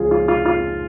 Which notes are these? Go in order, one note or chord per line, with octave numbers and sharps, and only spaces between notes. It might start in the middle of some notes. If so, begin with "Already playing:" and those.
Already playing: C#2 C#3 F3 F4 G#4
F4
F4
F4